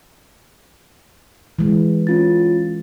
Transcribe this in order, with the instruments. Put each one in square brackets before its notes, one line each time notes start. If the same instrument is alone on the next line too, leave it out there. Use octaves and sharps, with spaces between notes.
[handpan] E3 G#3
[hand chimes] C#4 F4 A6